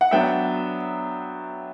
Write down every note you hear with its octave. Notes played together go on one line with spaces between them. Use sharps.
F#5
F#3 B3 D4 E5 G5